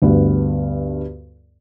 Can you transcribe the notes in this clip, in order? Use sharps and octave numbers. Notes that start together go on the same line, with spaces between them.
D2 G2 B3